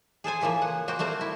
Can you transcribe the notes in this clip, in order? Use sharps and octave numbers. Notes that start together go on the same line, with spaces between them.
G#4 A4 C5 G#5
C#3 E3 F3 A#3
F#5
A#3 F#4 C5 G5
G3 A3 C4 C5
E4